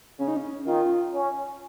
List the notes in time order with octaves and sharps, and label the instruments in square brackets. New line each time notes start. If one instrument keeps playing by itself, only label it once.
[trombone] C#3 [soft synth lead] C#4
[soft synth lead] D#4
C#4
[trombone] D#3 [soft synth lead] F4
[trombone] C#4